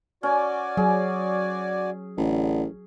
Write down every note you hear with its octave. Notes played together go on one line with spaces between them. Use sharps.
C#4 F#4 D5 G#5
F#3 G#4
A1 D3